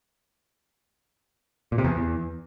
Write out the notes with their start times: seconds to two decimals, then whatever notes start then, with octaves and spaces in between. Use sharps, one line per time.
1.72 A#2
1.78 C3
1.84 E2